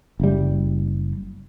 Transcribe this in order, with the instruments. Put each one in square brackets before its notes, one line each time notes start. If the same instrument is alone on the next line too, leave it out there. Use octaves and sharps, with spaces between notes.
[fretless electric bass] F#1 G3